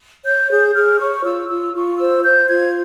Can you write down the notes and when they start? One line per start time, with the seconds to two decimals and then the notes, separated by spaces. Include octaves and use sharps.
0.25 C#5 G6
0.50 G#4 G6
0.74 G#4 F6
0.99 C#5 C#6
1.24 F4 E6
1.49 F4 E6
1.74 F4 C#6
1.98 C5 E6
2.24 C5 G6
2.48 F4 G#6